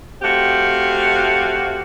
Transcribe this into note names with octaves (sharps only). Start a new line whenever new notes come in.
A3 C4 F#4 G4 F5